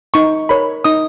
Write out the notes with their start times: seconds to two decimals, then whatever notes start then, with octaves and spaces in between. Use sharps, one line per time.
0.14 D#4 C#6
0.49 A#4 C#5 B5
0.84 D#4 D#6